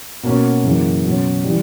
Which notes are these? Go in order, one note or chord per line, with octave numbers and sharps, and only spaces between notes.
B2 A#3 C#4 F#4
F#2 C#3 E3 A#3
B2 F#3 C#4
E3 G3